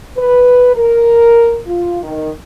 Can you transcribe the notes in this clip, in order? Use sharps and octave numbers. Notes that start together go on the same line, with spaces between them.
B4
A#4
F4
D#3